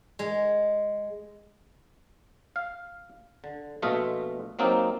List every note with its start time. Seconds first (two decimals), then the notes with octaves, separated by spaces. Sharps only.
0.19 G#3
2.56 F5
3.44 D3
3.82 A#1 B2 A3 F4 D#5 E5
4.59 F#3 A#3 C4 D#4 F4